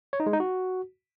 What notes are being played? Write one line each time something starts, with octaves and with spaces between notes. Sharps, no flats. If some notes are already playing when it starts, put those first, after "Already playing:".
C#5
D#4
G#3
D#4
F#4